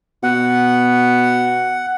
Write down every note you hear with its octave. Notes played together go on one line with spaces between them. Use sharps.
B2 F#5